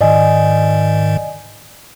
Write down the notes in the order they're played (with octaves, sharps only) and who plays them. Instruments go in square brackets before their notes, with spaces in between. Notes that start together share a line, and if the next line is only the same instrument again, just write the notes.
[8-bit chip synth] G#2 D#3 [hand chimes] D5 D#5 G#5